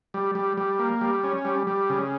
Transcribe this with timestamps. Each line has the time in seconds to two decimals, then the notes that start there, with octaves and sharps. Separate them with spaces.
0.14 G3
0.35 G3
0.57 G3
0.79 A#3
1.01 G3
1.24 C#4
1.45 G3
1.67 G3
1.90 C#3